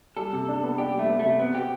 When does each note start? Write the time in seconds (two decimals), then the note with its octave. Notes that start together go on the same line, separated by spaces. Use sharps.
0.17 G3 A4
0.33 C3
0.48 D4
0.63 B3
0.78 D4 G4
0.94 G3 A3
1.09 B3
1.19 A3
1.24 C3
1.39 B3 C4
1.55 F#4 G4